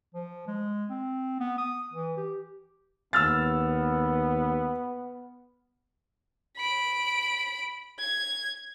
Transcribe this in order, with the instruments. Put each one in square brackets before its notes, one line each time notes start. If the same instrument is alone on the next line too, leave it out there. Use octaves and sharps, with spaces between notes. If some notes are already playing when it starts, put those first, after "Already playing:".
[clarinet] F3
G#3
C4
B3
D#6
E3
G4
[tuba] D#2 [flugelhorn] B3 [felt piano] E6 F6 A6
[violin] B5 D7
G#6